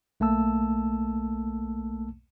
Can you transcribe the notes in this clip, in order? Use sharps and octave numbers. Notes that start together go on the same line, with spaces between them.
B1 A3 A#3 A5 E6